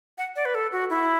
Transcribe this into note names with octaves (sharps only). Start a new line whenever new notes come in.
F#5
D5
B4
A4
F#4
E4